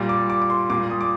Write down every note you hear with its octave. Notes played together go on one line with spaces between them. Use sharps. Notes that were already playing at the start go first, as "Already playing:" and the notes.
Already playing: A#2 G3
D6
D6
D6
C6
A#2 G3 D6
D#6
D6